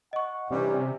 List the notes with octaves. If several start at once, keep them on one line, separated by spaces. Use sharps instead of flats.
D#5 F#5 C#6
G2 C3 E3 G3 C#4